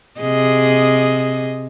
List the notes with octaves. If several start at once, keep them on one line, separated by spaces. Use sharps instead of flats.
C3 G#4 D#5